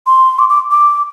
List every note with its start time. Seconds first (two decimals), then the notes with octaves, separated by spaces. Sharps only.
0.07 C6
0.39 D6
0.49 D6
0.71 D6